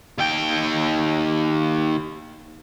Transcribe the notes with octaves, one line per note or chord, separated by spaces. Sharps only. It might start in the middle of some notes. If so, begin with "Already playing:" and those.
D#2 G5